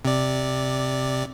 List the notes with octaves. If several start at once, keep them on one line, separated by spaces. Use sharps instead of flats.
C3 D5